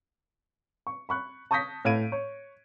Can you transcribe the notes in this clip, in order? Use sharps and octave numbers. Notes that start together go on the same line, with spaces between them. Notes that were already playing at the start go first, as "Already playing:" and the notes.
C#6
B5 C#6 F#6
A5 C#6 D#6 G6 A#6 B6
A2 F5 G#6 D7 D#7
C#5